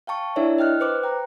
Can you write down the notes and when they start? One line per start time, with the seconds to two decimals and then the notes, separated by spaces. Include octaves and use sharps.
0.07 F5 G5 A5 C#6
0.36 D4 E4 A#4 C#5 D5 E5
0.58 D#5 G5 F6 F#6
0.80 B4 C5 D6 F#6
1.03 G5 A#5